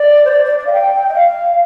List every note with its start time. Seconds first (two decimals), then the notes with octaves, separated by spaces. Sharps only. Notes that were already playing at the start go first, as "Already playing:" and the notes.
Already playing: D5
0.25 C5
0.30 D5
0.45 D5
0.58 D5
0.66 F5
0.72 G5
1.08 D#5
1.13 F5